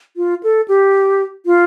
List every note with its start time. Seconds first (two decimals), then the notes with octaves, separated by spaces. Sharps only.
0.17 F4
0.43 A4
0.68 G4
1.46 F4